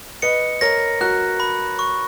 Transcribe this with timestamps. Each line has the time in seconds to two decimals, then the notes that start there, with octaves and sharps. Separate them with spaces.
0.22 B4 D#5 C#7
0.61 A#4 C#5 A#6
1.01 F#4 A#4 F#6
1.40 B5
1.79 C#6